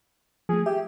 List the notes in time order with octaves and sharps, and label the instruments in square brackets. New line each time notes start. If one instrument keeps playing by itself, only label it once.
[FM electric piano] F3 A3 [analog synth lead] G#4
[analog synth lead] G4 [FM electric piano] E5